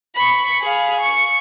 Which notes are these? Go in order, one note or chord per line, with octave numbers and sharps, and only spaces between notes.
B5 C#6
G#4 F5
C#6